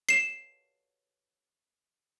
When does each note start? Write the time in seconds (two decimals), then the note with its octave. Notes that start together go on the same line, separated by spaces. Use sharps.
0.09 C7 E7